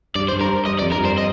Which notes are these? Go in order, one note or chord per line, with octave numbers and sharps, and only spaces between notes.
G2 D5
C5
G2
A#4
G2 D#5
F2 D5
G2 A#4
C5
D#5